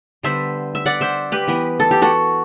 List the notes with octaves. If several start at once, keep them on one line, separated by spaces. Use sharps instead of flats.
D3 G3 B3 C5 E5
E5
D5 F#5
C5 E5
G4 B4
E3 B3
A4
G4
F#4 A4